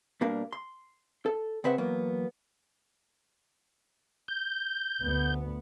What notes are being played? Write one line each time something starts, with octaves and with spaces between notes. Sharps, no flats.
B2 G3 A#3 D4 A#4 F5
C6
A4
C#3 C4 B4 C5 E5 F#5
E3 F#3 A#3 B3
G6
D2 B3